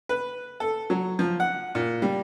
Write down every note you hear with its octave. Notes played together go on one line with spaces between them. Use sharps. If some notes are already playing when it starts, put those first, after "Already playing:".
B4
A4
F#3
F3
F#5
A#2
G3